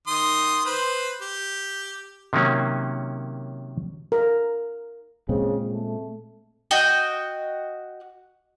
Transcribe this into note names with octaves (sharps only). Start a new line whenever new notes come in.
D#3 C6 D#6
B4 C5
G4
C3 D#3 F#3 A#3 C#4
A#4
A#2 C#3 G#3 C4
A3
F#4 D#5 G5